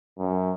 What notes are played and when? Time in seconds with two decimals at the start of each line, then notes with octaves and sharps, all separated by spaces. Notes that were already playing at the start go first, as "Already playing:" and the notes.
0.19 F#2